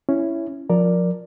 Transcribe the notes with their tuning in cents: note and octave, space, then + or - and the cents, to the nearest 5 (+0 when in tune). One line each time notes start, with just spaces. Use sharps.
C#4 +0 E4 +10
F3 +25 A#4 +5 D5 +0